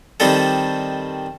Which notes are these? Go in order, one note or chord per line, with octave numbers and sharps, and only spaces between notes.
D#3 G3 C4 A4